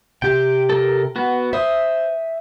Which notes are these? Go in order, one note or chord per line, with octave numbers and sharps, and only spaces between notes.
C3 G4 G5
A4 A#4
B3 F#4
C5 E5 D#6